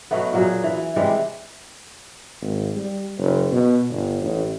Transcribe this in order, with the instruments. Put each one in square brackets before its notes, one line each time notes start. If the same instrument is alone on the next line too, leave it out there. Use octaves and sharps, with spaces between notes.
[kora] B2 F#3 A3 B3
A#2 F#3 G#4
E3
C3 E3 G3 G#3
[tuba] G#1
G3
F#1
B2
G1
A1